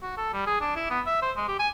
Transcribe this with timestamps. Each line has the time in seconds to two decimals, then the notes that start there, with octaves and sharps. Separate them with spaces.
0.02 F#4
0.17 A4
0.33 G3
0.46 G#4
0.61 D4
0.76 E4
0.90 B3
1.06 E5
1.22 C5
1.37 G#3
1.48 G4
1.59 G#5